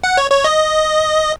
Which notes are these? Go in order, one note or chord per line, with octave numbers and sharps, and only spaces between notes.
F#5
C#5
C#5
D#5